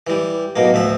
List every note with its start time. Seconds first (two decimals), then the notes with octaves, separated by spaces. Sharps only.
0.07 E3 G3
0.56 B1 B2 A#3
0.74 D2 F3 E5